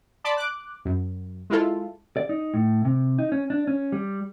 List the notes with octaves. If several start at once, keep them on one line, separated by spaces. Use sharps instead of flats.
D5 A5 B5 C6 D6
D6 F#6
F#2
G#3 E4 F4 A4
D5
D#4
A2
C3
D#4
C#4
D4
C#4
G3